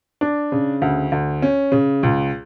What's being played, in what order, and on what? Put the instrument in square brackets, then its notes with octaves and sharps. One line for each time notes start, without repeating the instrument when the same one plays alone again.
[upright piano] D4
C#3
D2
D2
C#4
C#3
C#2